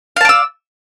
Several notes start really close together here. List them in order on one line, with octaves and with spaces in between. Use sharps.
F5 A5 D5 E6